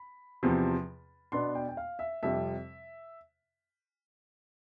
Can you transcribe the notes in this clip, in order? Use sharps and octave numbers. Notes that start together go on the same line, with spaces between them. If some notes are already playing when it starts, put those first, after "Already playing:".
Already playing: B5
E2 C3 F3
B2 B3 D4 C6
G5
G5
F5
E5
F2 C3 G3 E5